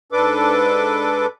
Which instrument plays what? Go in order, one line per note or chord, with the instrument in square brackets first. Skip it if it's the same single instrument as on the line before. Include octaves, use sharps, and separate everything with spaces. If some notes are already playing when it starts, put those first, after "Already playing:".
[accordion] G#2 D4 A4 B4 D6